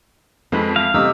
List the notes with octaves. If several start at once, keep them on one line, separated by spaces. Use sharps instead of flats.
F2 G#3 C4 A4 B4 B5
A3 F5
C3 A3 C4 D#4 D6 E6